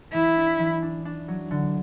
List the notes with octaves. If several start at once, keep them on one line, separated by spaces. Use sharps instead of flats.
E3 E4
D4
E3
D4
D4
F#3
D3